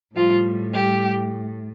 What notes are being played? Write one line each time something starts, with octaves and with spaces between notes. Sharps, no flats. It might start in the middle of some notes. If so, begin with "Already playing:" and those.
A2 F3 G3 F4
G3 G4